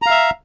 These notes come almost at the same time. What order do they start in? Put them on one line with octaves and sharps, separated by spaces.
A#5 F5 E5